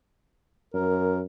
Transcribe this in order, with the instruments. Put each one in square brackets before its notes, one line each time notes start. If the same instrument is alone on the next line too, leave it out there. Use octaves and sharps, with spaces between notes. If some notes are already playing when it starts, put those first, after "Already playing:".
[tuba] F#2 [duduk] A#4